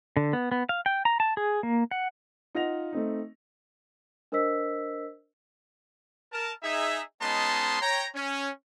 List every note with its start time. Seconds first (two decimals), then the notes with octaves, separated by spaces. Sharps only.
0.17 D3
0.33 B3
0.52 B3
0.69 F5
0.86 G5
1.05 A#5
1.20 A5
1.37 G#4
1.63 A#3
1.91 F#5
2.55 D#4 F4 F5 F#5 A#6 F7
2.93 A3 C4 D#4
4.32 D4 A#4 C5 D#5 E6 B6
6.32 A#4 A5
6.63 D#4 G#4 E5
7.22 G#3 B3 C#4 D#4 A5 C6
7.81 C#5 G5 A#5
8.14 C#4